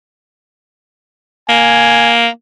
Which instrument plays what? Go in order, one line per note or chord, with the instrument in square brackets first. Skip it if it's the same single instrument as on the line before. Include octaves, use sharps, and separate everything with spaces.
[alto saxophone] A#3 [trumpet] G#5